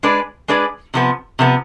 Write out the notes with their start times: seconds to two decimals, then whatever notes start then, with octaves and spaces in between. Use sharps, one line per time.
0.03 G#3 D4 G#4 B4 D5
0.48 G#3 D4 G#4 B4 D5
0.94 C3 F3 B3
1.39 C3 F3 B3